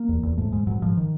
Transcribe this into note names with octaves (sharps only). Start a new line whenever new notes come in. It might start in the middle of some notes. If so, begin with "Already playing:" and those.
Already playing: A#3
E2
E2
G#2 A3
G#2 G#3
G#2 F#3
G#2 F3
D#3